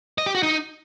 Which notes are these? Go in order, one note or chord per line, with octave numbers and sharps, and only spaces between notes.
D#5
G4
F#4
D#4